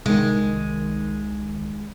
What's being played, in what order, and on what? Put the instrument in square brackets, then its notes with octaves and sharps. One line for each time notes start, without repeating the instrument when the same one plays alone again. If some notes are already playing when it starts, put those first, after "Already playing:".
[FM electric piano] C2 D#3 [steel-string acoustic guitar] G#3